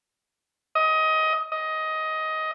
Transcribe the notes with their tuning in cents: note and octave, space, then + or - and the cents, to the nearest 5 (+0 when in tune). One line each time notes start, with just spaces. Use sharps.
D#5 +20
D#5 +15